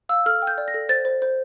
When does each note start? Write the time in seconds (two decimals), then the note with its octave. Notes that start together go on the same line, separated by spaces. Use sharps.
0.09 F5 E6
0.26 A4 F6
0.42 G5
0.47 G6
0.58 D5
0.68 A#6
0.74 A4
0.89 C5 A6
1.05 C5
1.22 C5